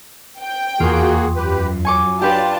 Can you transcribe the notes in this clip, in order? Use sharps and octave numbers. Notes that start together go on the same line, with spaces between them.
G5
E2 A#3 F4 F#4 G#4
F#2 G4 B4
F#3 G#5 C#6 D6
D4 F4 G4 B4 G5 A5